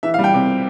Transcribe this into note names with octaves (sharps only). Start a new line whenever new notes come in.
E3 E5
F5
G3
G5
C3